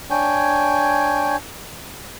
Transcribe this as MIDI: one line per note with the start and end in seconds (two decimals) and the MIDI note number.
0.10 1.36 62
0.10 1.36 73
0.10 1.36 79
0.10 1.36 80